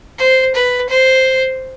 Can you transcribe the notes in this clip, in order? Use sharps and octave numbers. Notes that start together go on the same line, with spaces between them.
C5
B4
C5